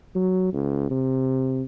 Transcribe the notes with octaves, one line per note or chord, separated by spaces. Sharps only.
F#3
C#2
C3